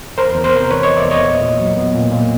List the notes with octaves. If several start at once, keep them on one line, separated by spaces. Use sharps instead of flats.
E2 A#4 C5
E2
A#4 C5
C3
E3 B4 C#5
E2 C#5 D#5
D5 E5
E2
C#5 D#5
A#2
A#2
F#3
B3
A#2
A#2